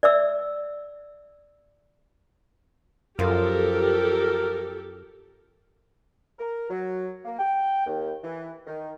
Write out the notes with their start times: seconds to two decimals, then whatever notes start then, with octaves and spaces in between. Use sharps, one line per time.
0.03 D5 E5 E6
3.19 F#2 F3 F4 G4 A4 A#4
6.39 A#4
6.70 F#3
7.25 A#3
7.39 G5
7.87 D#2
8.24 E3
8.67 D#3